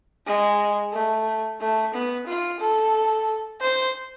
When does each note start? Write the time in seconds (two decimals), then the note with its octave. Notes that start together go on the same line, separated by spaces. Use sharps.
0.27 G#3
0.93 A3
1.61 A3
1.94 B3
2.27 F4
2.60 A4
3.61 C5